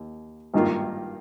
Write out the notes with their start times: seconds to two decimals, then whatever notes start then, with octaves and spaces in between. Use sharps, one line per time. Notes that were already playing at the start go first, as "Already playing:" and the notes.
Already playing: D#2
0.54 G#1 G2 D#3 A#3 F4